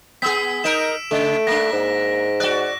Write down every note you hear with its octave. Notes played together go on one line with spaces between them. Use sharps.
B3 G#4 E6 B6
D#4 A#4 D7 E7
C#3 A3
A#3 D4 A#6
G#2
F#4 D5 F#6